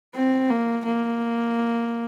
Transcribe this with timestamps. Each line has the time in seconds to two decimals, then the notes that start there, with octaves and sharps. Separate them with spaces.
0.15 C4
0.50 A#3
0.85 A#3